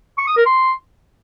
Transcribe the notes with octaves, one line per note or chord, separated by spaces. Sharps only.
C#6
D#6
A#4
C6